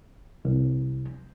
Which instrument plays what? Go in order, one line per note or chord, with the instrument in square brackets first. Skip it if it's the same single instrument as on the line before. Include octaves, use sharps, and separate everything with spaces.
[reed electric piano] C2